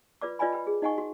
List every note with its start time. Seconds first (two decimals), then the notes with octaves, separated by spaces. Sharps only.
0.21 F4 B4 D5 D6
0.39 F4 B4 D5 D#5 G#5 B5
0.52 B4 G5 B5
0.67 G#4
0.82 D#4 D#5 F#5 G#5 C#6
0.98 F#4